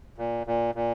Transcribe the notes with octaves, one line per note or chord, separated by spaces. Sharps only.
A#2
A#2
A#2